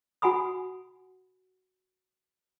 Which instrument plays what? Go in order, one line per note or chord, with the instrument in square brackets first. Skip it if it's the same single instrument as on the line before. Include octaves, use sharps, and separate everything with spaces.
[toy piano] F#4 F#5 G#5 B5 D#6